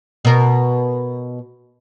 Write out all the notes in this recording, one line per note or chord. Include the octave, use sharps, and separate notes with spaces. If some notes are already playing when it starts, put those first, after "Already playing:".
B2 A#4